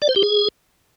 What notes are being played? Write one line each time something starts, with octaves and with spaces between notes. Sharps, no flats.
D5
C5
G4
G#4